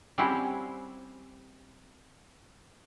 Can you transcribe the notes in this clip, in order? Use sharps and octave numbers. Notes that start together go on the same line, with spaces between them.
G3 C4 C#4 E4 F#4 C5